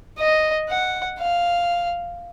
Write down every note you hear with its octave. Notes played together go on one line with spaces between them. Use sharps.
D#5
F#5
F5